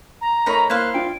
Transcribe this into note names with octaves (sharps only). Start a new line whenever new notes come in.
A#5
A3 D#4 A#4 C#5 B5 C#6
A#3 E4 C5 F5 F#6
D4 F4 G5 D7